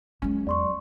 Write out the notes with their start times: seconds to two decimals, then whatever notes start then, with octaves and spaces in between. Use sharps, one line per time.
0.22 F#3 G#3 C#4
0.47 E2 D5 C6 C#6